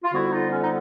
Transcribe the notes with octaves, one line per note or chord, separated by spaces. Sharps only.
F4
F2 D3 G3 B3 E4 F#4
D#4 F4
C#4
D#4